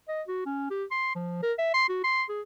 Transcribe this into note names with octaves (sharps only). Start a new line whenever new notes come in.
D#5
F#4
C#4
G4
C6
F3
A#4
E5
C6
F#4
C6
G#4